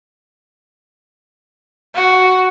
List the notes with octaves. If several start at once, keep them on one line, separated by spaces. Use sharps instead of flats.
F#4